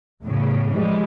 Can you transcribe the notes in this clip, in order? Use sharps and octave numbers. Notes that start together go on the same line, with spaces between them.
E2 A2 C#3
A2 E3 F3 G3 G#3